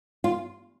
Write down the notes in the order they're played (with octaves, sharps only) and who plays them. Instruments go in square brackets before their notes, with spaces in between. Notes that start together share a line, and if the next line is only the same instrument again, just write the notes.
[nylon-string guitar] F4